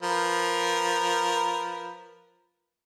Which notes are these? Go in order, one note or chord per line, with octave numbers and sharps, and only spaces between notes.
F3 A#4 B4